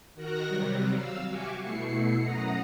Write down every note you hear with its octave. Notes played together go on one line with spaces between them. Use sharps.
D#3 F#4 A#4 A#5 F#6 A#6
C3 F#3 G3
F5 E6
F#4 G4 E5 G#5 C#6 D6
B2 A3 E4 C7 C#7
F#2 F#5 A#5 D#6 A#6